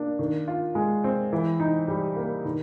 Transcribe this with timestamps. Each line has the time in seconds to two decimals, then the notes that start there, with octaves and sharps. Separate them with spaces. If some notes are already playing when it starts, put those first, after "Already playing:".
Already playing: A#3 D4
0.19 D#3
0.48 F4
0.75 G#3
1.04 C4
1.33 E3
1.60 D#4
1.88 G3
2.16 A#3
2.45 D#3